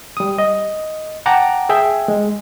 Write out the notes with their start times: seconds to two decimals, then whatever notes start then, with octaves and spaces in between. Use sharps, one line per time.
0.17 G3 D#6
0.39 D#5
1.26 F#5 G5 A5 A#5 D6
1.69 G#4 E5 G5
2.08 G#3